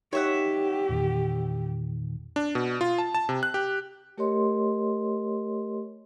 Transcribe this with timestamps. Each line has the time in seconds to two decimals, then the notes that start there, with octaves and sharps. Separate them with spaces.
0.13 D#4 G4 C#5 E5 F#5
0.89 E2 A#2 D#3
2.36 D4
2.55 B2
2.81 F4
2.98 A5
3.15 A5
3.29 C3
3.43 F#6
3.54 G4
4.18 A3 G4 A#4 C#5 D#5 C6